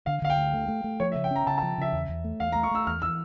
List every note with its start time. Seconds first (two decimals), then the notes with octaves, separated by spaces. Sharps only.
0.06 D3 F5
0.22 D3 F5
0.30 G5
0.38 D2
0.53 A3
0.68 A3
0.84 A3
1.00 F3 C#5
1.12 E5
1.16 C#3
1.24 G5
1.31 C#4 A#5
1.47 C#3 A5
1.58 A5
1.62 F3
1.78 C#3 E5
1.93 E2
2.09 E2
2.24 A3
2.40 E2 F5
2.52 A#5
2.55 A3
2.63 C#6
2.71 A3 E6
2.87 E2 F6
3.02 E3 E6